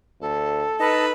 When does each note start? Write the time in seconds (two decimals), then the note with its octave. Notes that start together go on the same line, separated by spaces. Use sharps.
0.21 D2 A4
0.80 D#4 B4 D#5 A5